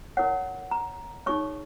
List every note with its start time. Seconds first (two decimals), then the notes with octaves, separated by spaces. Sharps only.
0.17 E4 A#4 C#5 F#5
0.71 A#5
1.26 D#4 G#4 C#5 C#6